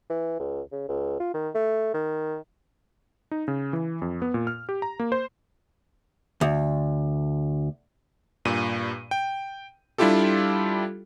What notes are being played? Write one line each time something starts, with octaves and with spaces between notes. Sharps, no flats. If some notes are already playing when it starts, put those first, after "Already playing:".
E3
C#2
C#3
C#2
F4
D#3
A3
D#3
D#4
C#3
E3
F2
B3
A#2
F6
G4
A#5
A#3
C5
D2
G2 A#2 D#7
G5
G3 D4 E4 F4 G4 A4